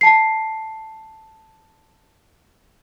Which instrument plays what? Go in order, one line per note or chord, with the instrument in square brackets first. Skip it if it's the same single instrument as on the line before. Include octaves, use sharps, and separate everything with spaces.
[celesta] A5 C7